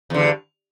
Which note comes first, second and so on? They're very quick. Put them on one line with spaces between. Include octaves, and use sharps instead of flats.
E2 D3 G2